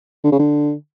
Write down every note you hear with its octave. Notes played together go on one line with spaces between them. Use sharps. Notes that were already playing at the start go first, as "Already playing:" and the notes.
D3
C#3
D3